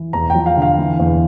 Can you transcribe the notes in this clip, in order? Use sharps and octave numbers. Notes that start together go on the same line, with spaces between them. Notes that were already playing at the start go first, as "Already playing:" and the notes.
Already playing: E3
E2 A#5
F3 G5
F5
D3 F5
E3
E2